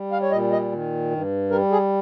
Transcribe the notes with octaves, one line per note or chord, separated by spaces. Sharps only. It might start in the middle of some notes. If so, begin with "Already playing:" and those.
Already playing: G3
F5
C#5
A#2 D#5
D#5
D#3
G2
G3 A#4
G#4